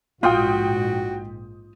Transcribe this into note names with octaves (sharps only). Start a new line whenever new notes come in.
A#1 G#2 F4 F#4 G5 D#6 G6